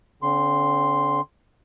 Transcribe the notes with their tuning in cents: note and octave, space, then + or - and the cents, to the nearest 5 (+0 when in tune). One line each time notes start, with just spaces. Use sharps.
D3 -35 C4 +10 C6 +0